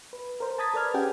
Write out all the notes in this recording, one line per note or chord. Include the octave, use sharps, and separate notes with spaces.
B4
A#4 C5
A5 A#5 D#6 G#6 A6 B6
A4 B4 D5 F6 G#6
C#4 G4 G#4 F#5 G5